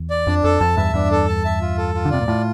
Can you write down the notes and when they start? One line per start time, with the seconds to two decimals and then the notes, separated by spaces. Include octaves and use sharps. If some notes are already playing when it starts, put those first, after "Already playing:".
Already playing: E2
0.10 D5
0.27 F2 D4
0.44 F2 A4
0.60 F2 A5
0.77 E2 G2 E5
0.94 E2 G2 D4
1.11 A4
1.28 A5
1.45 E5
1.62 F4
1.78 A4
1.95 F4
2.05 D3
2.11 C3 D5
2.21 A#2
2.27 A2 F4